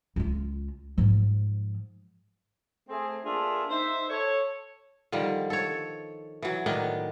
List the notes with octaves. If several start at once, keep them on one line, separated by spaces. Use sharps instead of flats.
C#2 F4
G#2 F3
A3 C4 G#4
A#3 D4 F4 G#4 A4 E5
D#4 C5 E5
A4 C#5
D3 D#3 F3 G3
A4 C#5
E3 F#3
A2 D#3 B3 D4